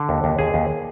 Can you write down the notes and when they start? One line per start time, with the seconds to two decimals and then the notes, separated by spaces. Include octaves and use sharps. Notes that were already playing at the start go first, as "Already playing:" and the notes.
Already playing: D3
0.09 D#2
0.24 D#2
0.39 D#2 G#4
0.54 D#2